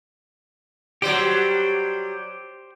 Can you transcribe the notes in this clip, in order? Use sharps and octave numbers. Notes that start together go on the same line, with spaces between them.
F#3 G3 G4 C5